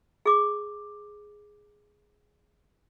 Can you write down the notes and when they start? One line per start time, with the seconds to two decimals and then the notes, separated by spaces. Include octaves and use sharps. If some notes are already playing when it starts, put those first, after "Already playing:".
0.26 G#4 D6